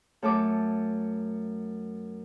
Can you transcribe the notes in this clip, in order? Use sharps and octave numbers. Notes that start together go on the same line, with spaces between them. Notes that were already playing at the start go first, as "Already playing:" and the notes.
F#2 A3 A4 D6